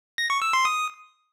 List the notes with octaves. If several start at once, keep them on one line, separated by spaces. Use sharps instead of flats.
A#6
C#6
E6
C6
D#6